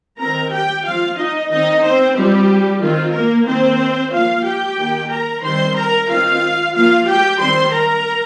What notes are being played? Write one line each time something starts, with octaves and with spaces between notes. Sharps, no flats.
D#3 C4 A#4 A#5
G4 G5
F3 C4 F4 F5
D#4 D#5
D#3 C4 D#4 D#5
C4 C5
F3 G3 C4 G4
D#3 C4 F4
A#3 A#4
D#3 A#3 C4 C5
F3 A#3 F4 F5
G4 G5
D#3 A#3
A#4 A#5
D#3 G3 C4 C5 C6
A#4 A#5
D#3 C4 F4 F5
F3 A#3 F4 F5
G4 G5
D#3 G3 C4 C5 C6
A#4 A#5